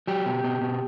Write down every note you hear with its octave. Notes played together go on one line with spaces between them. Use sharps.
F#3 G4
B2
B2
B2